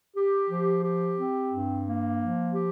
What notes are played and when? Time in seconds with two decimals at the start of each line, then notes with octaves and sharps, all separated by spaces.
0.15 G4
0.49 F3
0.84 G4
1.17 C4
1.52 G2
1.86 A#3
2.20 F3
2.54 G4